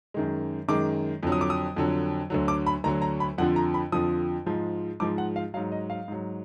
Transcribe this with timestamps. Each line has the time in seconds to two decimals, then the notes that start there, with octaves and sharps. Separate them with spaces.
0.14 F#2 D#3 G#3
0.68 F#2 D#3 G#3 D6
1.23 F2 D3 F#3
1.32 D#6
1.41 D6
1.50 D#6
1.76 F2 D3 F#3
2.30 D2 D3 F#3
2.48 D6
2.67 B5
2.84 D2 D3 F#3 A#5
3.02 A#5
3.20 B5
3.38 F2 D3 F3 F#5
3.56 A#5
3.74 B5
3.92 F2 D3 F3 D#6
4.46 G#2 F3 G#3
5.00 G#2 F3 G#3 D6
5.18 F#5
5.36 F5
5.54 F#3 F5
5.57 G#2
5.72 D#5
5.90 F5
6.08 G#2 F#3